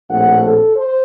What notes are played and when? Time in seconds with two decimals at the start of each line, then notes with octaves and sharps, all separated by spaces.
0.10 A#1 A2 A3 C4 F#5
0.43 A4
0.74 C5